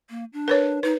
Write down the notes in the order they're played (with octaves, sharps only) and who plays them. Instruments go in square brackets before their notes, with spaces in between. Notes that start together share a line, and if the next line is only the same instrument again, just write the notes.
[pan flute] A#3
D4
[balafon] A#4 B4 C#5
[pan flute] D#4 [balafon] B4